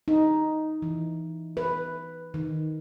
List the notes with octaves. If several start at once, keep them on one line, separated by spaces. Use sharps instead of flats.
D#4
E3
B4
D#3